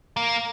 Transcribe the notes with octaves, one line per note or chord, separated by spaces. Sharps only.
A#3